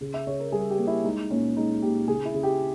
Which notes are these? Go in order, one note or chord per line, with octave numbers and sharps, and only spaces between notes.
C#3
E5
C#3 C#5
A#4
G3 G#4
G4
A#3
E4
G#3 D#4
A#2 C#4
G#3 D#4
A#2 G4
C#3 G#4
E4
C#3
G4